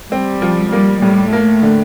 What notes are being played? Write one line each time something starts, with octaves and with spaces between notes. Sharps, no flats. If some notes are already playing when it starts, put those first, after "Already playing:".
G3 C4
F3
G3 A#3
A2 G3
A3 A#3
D3